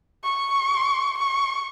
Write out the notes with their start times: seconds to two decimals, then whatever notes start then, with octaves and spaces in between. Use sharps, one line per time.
0.24 C#6
1.18 C#6